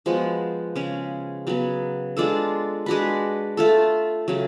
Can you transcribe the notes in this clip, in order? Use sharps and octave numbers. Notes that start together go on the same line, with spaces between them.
F3 G#3 B3 F#4
C#3 G#3 C#4
C#3 F#3 B3
G#3 D4 F4 A4
G#3 D4 F#4 B4
A3 F4 A4
C#3 F#3 A3